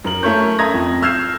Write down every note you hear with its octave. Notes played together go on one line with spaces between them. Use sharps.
F#2 A#4 F#7
A3 C#4 A4 A#4 C#5 G6
E5 A5 A#5 D#6 G#6 A#6
F2
E6 F6 G6 G#6 C7 E7